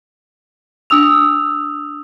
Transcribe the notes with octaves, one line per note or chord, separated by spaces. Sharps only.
D4 D#6 E6 F7